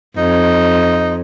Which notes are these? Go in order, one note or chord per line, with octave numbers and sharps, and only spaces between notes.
F2 D#4